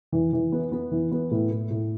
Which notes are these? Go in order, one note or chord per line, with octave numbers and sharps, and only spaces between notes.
E3
E3
B3
B3
E3
B3
A2
A2
A2